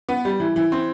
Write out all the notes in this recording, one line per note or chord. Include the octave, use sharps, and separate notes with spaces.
B3
G3
E3
E3
C4